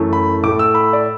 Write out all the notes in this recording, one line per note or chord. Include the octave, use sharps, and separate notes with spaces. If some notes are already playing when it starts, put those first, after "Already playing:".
Already playing: F#2 E3 A3
B5
A2 A3 D6
E6
B5
D5